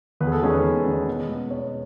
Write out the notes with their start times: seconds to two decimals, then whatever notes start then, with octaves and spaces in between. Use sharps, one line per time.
0.20 E2 B4
0.27 G#4
0.32 A4
0.42 D#3 G#3 C#4 G#4
0.53 B4
0.64 E2
0.86 D#3 G#3 C#4
1.07 B2
1.29 G#3 B3
1.50 B2 C#5